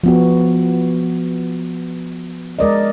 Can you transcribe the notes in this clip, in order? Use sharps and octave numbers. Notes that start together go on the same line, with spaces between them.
F3 B3 F#4
G#3 A#4 D5 D#5